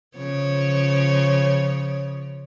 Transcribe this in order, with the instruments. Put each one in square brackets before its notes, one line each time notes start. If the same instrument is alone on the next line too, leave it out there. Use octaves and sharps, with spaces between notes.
[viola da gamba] C#3 F3 C#5